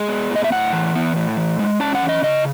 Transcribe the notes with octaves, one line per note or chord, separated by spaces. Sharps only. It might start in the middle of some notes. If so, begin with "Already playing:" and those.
Already playing: G#3 G#4
B3
A2 D#5
E5
A2 F#5
E3
B3
A2
E3
G#3
C#4 A5
F#5
E3
D#5
C#3 D#5